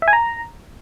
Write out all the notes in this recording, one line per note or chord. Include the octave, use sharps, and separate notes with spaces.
E5
G#5
A#5